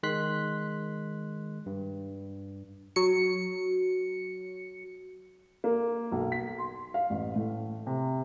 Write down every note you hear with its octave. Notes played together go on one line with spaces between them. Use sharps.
D#3 G#3 C6 F#6 B6
G2
F#3 C#7
A#3
B1
B6
C6
F5
A1
A2
C3